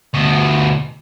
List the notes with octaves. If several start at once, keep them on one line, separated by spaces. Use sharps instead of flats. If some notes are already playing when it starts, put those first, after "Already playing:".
D2 B2